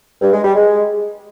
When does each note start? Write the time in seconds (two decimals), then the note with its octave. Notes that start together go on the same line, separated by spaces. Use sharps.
0.22 G2
0.33 G#3
0.44 G3
0.55 G#3